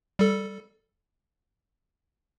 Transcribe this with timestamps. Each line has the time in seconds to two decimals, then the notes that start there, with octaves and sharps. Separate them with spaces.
0.19 G3 A4